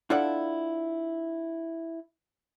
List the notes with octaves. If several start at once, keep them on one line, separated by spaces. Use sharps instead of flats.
D4 E4 F4 A4 D5 F#5